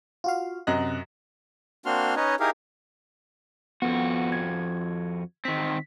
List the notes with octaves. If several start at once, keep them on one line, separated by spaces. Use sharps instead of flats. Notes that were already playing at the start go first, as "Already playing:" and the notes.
F4 F#4 F5
F#2 C3 D#5 F#6
A#3 C4 D4 F#4 C6 F6
C#4 D#4 B4 C#5 D#5
D#4 E4 G4 G#4 A#4 F5
F2 B3 F#4
G#6
D#3 C4 B6